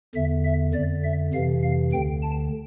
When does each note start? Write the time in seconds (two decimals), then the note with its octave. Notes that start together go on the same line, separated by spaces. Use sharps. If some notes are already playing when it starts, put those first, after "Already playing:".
0.15 E2 D3 E5
0.45 E5
0.74 F2 D3 D5
1.04 E5
1.34 F2 C3 E3 F5
1.63 F5
1.92 D2 D3 G5
2.22 A5